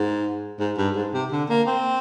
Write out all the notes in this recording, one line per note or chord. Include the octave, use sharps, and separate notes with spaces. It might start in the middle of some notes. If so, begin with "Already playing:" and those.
Already playing: G#2
G#2
G2
G#2
C3
D3
A#3
C4